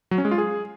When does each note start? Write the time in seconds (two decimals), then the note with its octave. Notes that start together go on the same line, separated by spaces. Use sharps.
0.11 F#3
0.18 C#4
0.25 G#3
0.31 F4
0.38 G#4